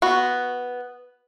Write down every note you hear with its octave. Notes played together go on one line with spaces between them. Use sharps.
B3 F#4